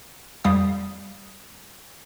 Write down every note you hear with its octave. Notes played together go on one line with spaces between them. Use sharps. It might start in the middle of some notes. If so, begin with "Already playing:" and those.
F2 G3 F5 D#6